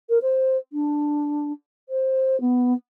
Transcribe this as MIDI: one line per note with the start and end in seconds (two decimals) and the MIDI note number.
0.09 0.18 70
0.22 0.57 72
0.73 1.52 62
1.89 2.39 72
2.41 2.74 59